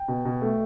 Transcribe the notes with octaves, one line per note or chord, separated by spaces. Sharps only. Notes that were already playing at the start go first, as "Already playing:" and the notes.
Already playing: G5
B2
B2
A3